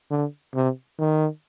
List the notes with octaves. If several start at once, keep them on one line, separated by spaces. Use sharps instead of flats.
D3
C3
D#3